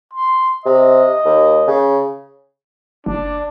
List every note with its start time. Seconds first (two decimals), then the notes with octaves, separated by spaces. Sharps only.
0.13 C6
0.66 C3 D#5
1.25 D#2
1.67 C#3
3.06 F#1 D4